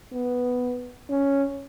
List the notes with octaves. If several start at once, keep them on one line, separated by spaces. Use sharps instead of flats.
B3
C#4